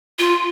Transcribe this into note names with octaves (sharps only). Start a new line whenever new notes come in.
F4